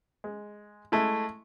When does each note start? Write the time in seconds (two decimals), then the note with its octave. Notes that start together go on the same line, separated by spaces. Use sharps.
0.24 G#3
0.92 G#3 A3 E4